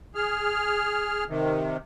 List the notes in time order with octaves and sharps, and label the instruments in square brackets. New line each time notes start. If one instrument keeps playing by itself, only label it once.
[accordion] G#4 F6
C3 D#3